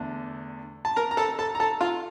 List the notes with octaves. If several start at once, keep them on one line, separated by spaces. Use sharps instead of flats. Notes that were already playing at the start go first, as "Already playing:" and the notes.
Already playing: E2 D3 A3 D4
A5
A#4 A#5
A#5
A4 A5
A4 A5
A#5
A4 A5
F4 F5